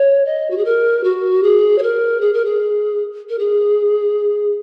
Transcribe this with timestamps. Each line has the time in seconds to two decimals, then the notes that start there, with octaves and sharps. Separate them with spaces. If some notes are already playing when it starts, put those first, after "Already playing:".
Already playing: C#5
0.25 D#5
0.50 F#4
0.57 G#4
0.64 A#4
1.03 F#4
1.43 G#4
1.78 C#5
1.82 A#4
2.20 G#4
2.33 A#4
2.44 G#4
3.29 A#4
3.38 G#4